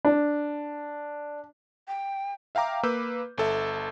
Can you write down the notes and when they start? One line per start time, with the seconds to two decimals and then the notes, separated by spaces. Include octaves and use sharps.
0.05 D4
1.88 G5
2.55 E5 F5 G5 A#5 D6
2.83 A#3 B4 D6 E6 G6
3.38 G1 A4 E5